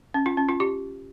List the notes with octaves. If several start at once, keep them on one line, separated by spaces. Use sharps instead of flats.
C#4
F4
C#4
F4
G4